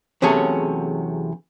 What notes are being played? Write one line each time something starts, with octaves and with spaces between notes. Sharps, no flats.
E2 C3 F#3 A3 C#4 G#4